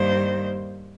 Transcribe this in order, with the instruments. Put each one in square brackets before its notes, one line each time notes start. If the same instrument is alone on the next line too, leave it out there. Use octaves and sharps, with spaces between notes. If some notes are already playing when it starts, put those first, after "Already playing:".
Already playing: [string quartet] G2 D#3 G3 A#3 C5